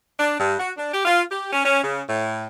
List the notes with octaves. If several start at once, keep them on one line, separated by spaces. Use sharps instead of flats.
D4
G2
F#4
D4
G4
F4
G4
C#4
C#4
C#3
A2